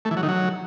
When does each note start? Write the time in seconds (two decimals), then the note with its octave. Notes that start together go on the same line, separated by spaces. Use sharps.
0.05 A3
0.11 E3
0.17 F#3
0.23 D#3
0.29 F#3